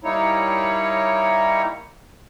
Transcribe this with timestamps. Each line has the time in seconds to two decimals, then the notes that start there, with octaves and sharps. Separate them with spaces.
0.04 G3 A#3 D#4 E4 C#5